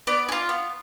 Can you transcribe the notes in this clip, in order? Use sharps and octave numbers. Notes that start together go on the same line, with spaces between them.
B3 D5
G#4
F4
B3